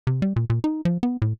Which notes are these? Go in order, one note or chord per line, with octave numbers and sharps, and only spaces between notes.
C3
G3
A#2
A#2
D#4
F3
B3
A2